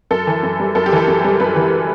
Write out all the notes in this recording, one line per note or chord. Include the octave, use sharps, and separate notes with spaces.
F#2 A4
E3
F#2
G3
F#2 A4
G4
E3 A4
F#2
G3
F#2 B4
E3